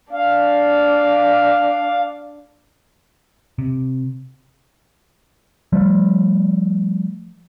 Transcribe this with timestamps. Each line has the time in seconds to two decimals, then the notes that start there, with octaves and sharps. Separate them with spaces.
0.13 D4 F5
3.58 C3
5.73 F3 G3 A3